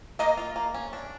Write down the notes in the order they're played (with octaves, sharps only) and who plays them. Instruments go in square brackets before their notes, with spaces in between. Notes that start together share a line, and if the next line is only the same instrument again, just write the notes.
[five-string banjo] A#3 [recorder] D#5
[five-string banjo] F4
A#3
C#4
D4